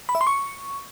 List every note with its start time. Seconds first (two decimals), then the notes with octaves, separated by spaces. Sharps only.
0.09 B5
0.15 E5
0.21 C6
0.27 C#6